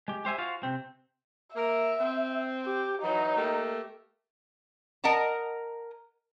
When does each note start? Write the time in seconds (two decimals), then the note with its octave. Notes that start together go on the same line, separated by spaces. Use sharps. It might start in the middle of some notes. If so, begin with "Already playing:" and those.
0.08 G#3 G4
0.25 G4 C5 E5 G#5
0.38 F4 F#4 C5 F5
0.63 C3 C4
1.56 A#3 A#4 E5
1.99 C4
2.66 G4
3.03 E3 F#3 D#4
3.36 A3 A#3 G4
5.04 A#4 D#5 F#5 A5 A#5